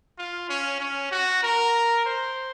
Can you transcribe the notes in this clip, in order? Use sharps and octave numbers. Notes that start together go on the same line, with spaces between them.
F4
C#4
C#4
F#4
A#4
C5